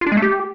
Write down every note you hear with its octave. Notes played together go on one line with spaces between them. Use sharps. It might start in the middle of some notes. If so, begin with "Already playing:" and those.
F4
D4
G#3
A3
G4